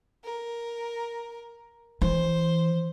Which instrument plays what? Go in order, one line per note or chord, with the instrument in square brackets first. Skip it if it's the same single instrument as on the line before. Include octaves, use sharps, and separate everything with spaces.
[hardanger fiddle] A#4
[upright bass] E3 [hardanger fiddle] C5